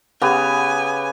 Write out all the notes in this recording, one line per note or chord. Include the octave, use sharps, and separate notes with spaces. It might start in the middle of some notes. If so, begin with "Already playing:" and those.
C#3 B3 G4 G#5